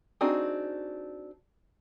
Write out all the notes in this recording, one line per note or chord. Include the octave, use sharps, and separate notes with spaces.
C4 D4 D#4 F#4 G#4